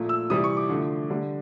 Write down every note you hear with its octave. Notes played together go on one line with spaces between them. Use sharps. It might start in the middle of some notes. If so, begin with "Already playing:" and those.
Already playing: A#2 F3 A3
E6
C3 E3 G3 D#6
C#6
D6
D3 F3 A3
D3 G3